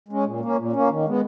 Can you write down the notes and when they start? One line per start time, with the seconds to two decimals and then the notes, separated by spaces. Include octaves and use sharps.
0.08 G#3 C#4
0.25 A#2
0.40 A#3 C#4
0.56 A#2
0.72 A#3 C#4
0.89 D#3
1.05 G#3 B3